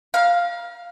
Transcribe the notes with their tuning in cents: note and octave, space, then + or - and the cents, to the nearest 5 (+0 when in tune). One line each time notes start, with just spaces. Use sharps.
F5 +0 A#5 +45